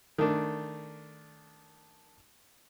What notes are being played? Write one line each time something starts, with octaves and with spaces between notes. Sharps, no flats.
D#3 A3 D4